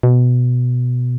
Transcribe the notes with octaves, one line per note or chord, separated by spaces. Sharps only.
B2